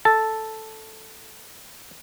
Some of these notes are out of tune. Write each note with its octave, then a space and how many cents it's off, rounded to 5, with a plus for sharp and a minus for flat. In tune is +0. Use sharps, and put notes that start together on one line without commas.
A4 +0 A5 +0